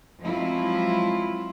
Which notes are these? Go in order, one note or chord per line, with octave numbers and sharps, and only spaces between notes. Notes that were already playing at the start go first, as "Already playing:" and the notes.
F3 F#3 G#3 C4 E4 F4